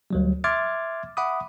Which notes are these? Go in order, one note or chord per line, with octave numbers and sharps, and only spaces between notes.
D2 F#3 G3
E5 C6 D6 F6 G#6 A6
E5 F#5 B5 D6 D#6